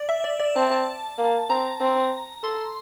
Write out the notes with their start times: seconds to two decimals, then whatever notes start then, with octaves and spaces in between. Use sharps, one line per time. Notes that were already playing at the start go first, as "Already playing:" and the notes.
Already playing: D5
0.09 E5
0.24 D5
0.39 D5
0.56 C4 A5
0.71 A5
1.18 A#3
1.50 C4 A#5
1.81 C4
2.43 A4 C6